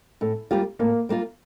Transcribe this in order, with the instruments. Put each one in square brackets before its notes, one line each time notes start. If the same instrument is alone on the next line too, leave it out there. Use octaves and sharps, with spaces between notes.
[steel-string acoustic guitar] A2 [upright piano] A4
[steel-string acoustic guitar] G3 A#3 F4 [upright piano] G4
[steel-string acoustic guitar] A2 [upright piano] A#3
[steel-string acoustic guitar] G3 A#3 F4